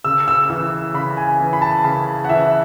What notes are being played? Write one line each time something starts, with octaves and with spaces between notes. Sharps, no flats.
C#3 E6
E6
E3 E6
C#3 B5
G#5
E3
B5
A5
C#3 B5
F#5
E3 E5